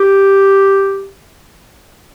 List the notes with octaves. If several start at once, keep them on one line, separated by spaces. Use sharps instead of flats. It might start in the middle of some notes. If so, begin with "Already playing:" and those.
Already playing: G4